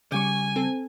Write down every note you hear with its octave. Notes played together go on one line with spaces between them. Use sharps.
C#3 G3 G#5 C#6 D6
C4 A4